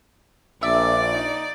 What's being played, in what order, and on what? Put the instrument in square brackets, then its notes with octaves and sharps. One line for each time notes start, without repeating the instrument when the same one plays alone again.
[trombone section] A#1 [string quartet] D5 [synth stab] E5 [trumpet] D6
[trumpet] D#4